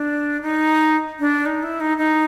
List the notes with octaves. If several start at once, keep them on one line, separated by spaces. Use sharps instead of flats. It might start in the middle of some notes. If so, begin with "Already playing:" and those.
Already playing: D4
D#4
D4
D#4
E4
D#4
D#4